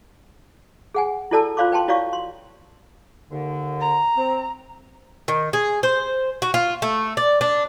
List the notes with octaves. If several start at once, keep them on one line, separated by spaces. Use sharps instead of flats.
G#4 F#5 G#5
E4 F#4 A4 D5 A5 E6
F4 C5 D5 F5 C6 D6
B4 G5 A5 C6
E4 F#4 C#5 D5 F5 C#6
C6
D#2 D3
A#5
C4
D#3
G#4
C5
F#4
F4
A3
D5
D4